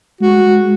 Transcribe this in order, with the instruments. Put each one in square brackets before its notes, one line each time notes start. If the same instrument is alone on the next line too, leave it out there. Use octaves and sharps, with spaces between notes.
[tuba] G#3 [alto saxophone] F#4